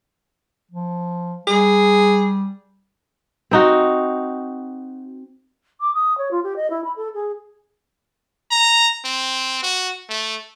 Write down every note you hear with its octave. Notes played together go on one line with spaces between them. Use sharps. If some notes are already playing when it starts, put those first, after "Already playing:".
F3
G3 G#4
C4 D#4 F#4
D6
D#6
C#5
F4
G4
D#5
E4
B5
A4
G#4
A#5
C4
F#4
A3